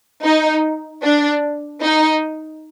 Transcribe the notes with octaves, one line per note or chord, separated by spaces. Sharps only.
D#4
D4
D#4